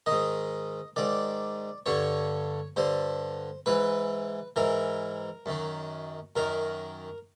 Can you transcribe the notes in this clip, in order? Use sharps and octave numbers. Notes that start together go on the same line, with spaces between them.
G#2 D#3 D#5
G#2 D#3 D5
G2 D3 C#5
G2 D3 C5
G#2 E3 B4
G#2 E3 A#4
F#2 D#3
F#2 D#3 A#4